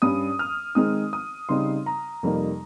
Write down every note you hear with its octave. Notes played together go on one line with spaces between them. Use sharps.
G2 G3 C#4 D#6
F6
D#3 G#3 C4 D#4 D#6
D#6
C#3 G3 C4 D#4 C6
A#5
F2 C3 G3 A#3 D#4